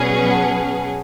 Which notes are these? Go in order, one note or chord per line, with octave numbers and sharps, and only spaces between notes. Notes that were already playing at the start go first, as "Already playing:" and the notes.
Already playing: B2 F#3 C#4 G#4 B4 D5 F#5
F#5 A5